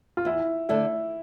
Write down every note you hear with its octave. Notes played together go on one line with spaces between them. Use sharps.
F4
E2 E4
D3 A3 D4 E4